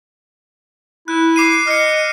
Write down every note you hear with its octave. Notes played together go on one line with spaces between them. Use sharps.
E4 F#6
D6 C7 D#7
D#5 F6 C#7